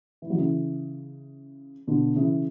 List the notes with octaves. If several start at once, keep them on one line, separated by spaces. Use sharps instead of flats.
E3
F#3
C#3 E3
B2 D3
C#3 E3